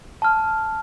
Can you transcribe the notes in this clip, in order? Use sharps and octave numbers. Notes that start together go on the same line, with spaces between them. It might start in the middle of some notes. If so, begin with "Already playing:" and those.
A5 F6